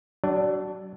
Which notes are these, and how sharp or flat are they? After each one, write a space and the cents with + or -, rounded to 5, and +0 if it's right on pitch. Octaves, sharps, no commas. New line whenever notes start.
F#3 +35 D4 +0